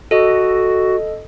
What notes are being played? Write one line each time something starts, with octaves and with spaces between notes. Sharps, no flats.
F#4 A4 D#5